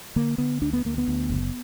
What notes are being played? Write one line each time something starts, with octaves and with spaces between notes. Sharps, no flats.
D3 A#3
D3 B3
D2 D4
B3
D2 A#3
B3
D2
F#1